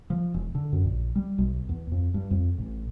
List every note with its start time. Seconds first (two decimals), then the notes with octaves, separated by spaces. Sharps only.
0.10 F3
0.34 E1
0.55 D3
0.73 F#2
0.84 A#1
1.15 G3
1.38 B1
1.69 E2
1.92 F2
2.14 G2
2.31 F2
2.58 A1